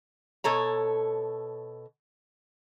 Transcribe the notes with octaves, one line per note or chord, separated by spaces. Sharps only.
B2 A4 C#5 A#5